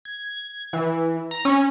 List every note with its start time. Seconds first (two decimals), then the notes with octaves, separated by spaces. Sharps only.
0.05 G#6
0.73 E3
1.31 A#5
1.45 C#4